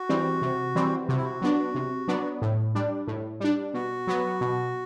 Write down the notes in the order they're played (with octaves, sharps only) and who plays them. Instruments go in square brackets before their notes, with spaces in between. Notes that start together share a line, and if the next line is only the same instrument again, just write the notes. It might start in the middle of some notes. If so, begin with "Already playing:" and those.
Already playing: [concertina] F#4
[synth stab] E3 G3 C4
C3
E3 G3 C4
[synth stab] C3 [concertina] F#4
[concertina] E4
F#4
[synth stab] F#3 B3 D4
C3
F#3 B3 D4
A2
G3 D4
A2
G3 D4
[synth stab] B2 [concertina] F#4
[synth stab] F#3 B3
B2